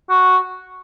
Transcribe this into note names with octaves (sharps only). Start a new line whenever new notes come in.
F#4